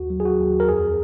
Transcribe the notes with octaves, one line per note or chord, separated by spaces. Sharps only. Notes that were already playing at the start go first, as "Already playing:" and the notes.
Already playing: D#2 F#4
F#3
G#4
F#4
D#2
A#4
F2 G#4